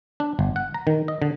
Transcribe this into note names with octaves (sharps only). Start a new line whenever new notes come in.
D4
G1
F#5
A#5
D#3
D#5
D3